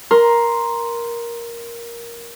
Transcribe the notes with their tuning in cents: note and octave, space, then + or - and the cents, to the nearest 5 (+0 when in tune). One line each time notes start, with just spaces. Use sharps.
A#4 +10 C6 +0